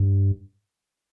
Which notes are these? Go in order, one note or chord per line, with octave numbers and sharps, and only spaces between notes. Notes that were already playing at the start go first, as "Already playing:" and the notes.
Already playing: G2